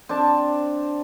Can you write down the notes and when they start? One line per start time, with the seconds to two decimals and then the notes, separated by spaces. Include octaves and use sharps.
0.09 C4 D4 A5